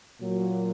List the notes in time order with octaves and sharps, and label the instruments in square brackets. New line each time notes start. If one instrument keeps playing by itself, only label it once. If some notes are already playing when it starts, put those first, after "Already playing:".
[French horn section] A#2 F#3 A#3